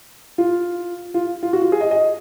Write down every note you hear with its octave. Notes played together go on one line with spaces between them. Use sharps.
F4
F4
F4
F#4
F4
G#4
D#5
D#5